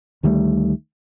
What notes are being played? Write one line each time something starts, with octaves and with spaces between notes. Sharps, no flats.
D2 D#3 G3 A3